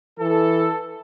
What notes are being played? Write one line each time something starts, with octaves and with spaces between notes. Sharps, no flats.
E3 A4